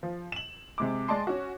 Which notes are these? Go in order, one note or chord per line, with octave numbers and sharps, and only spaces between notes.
F3
E7 F#7
C3 G#3 D6
G#3 D5 D#5 A5 C6
C#4 F#4